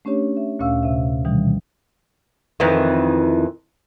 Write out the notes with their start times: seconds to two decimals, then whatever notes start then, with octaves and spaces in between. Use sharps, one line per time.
0.05 A3 C#4 D4 G4 C#5
0.37 E5
0.59 D2 A#2 C#4 F5 E6
0.83 C3 E5
1.25 B2 D#3 E3 G3
2.60 F2 D#3 E3